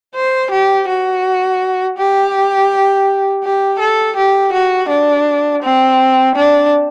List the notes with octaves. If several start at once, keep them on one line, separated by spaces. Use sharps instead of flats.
C5
G4
F#4
G4
G4
A4
G4
F#4
D4
C4
D4